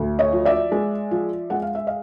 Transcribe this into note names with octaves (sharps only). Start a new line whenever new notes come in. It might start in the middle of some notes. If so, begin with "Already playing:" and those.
Already playing: D2
C#5 D#5
F3
D5 E5
G#3
F3
G#3 F#5
F5
E5
D#5 F5